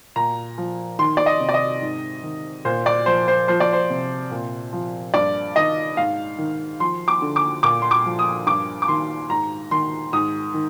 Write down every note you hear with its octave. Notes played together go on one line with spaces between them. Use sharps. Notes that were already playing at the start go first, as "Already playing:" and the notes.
A#2 A#5
F3
D#3 C6
D5
D#5
C3
D5
D#5
G#2
D#3
A#2 C5
D5
F3 C5
C5
F3 C5
D5
C5
C3
A#2
F3
G2 D5
D#3 D#5
G#2 F5
D#3
F3 C6
D6
D3
D6
A#2 D6
C6
D6
F3
D#6
G2 D6
D6
D#3 C6
G#2 A#5
D#3 C6
G#2 D#6
D#3